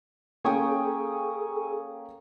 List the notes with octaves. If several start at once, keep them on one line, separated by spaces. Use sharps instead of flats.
A#3 C#4 G#4 A4 G5 G#5 C#6 D#6